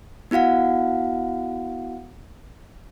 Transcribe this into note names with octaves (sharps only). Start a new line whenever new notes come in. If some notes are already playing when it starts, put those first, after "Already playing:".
B3 E4 F#4 F5 F#5